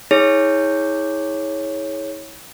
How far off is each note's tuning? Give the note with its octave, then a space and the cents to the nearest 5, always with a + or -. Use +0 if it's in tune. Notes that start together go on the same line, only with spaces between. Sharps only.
E4 -45 G#4 +0 C#5 -5